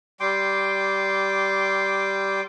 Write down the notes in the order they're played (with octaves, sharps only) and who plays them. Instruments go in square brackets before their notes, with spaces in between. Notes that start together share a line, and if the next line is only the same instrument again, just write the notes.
[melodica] G3 G5 C6 D6